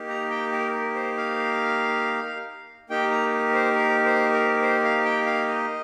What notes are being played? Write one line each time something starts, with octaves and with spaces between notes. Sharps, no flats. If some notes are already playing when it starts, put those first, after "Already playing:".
Already playing: A#3 D#4 G4
A#5
G5
A#4
A#4
C5
F5
A#3 D#4 G4 G5
A#5
C5
A#4
C5
A#4
C5
F5
G5
F5
D#5